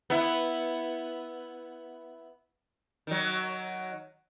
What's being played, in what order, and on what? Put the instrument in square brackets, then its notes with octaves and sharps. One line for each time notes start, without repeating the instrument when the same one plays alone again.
[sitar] B3 E4
D#3 F#3